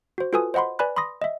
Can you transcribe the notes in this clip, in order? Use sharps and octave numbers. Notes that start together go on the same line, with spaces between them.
F#4 C5
F4 F#4 A4 B4 G#5 D#6
C5 D#5 F#5 B5 C6
B4 D5 G#5 B5 F#6
B5 C6 D#6 A#6
D#5 E5